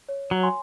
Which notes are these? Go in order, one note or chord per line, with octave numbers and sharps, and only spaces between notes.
C#5
F#3
G#5 C6